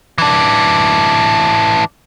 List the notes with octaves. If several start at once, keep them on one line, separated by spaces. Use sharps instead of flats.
E3 D4